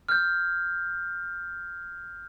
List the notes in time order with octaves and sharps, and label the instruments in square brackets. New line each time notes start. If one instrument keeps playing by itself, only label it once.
[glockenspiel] F6 G6